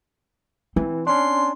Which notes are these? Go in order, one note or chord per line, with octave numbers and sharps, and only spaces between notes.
E3 C4
C#4 D4 C6